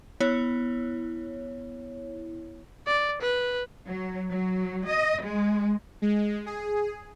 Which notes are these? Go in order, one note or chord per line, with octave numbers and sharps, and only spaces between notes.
B3 E4 C#5
D5
B4
F#3
F#3
D#5
G#3
G#3
G#4